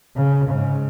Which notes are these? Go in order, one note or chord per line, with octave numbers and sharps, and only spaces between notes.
C#3
G#2 C#3